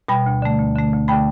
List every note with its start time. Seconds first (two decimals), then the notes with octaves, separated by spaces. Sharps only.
0.08 B2 G3 G5 B5
0.26 D2
0.42 D3 A3
0.59 D2
0.76 D3 A3
0.92 D2
1.08 A3 G5 B5
1.12 D3